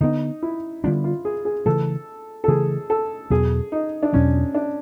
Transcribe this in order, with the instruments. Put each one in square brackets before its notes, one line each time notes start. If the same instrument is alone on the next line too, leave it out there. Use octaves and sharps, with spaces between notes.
[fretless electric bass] D3 G3 B3 D4 [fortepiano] D#4
[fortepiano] E4
[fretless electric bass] D3 G3 B3 D4 [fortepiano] F4
[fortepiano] F4
G#4
G#4
[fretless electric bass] C#3 E3 A3 [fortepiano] A4
[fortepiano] A4
[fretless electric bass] C#3 E3 A3 [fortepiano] G#4
[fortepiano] A4
[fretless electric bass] E2 B2 F#3 B3 [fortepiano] G#4
[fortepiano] D#4
D4
[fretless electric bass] E2 B2 F#3 B3 [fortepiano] C#4
[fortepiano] D4